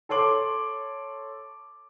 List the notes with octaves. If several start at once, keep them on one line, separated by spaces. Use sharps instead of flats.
A4 C#5 C6 D6 F#7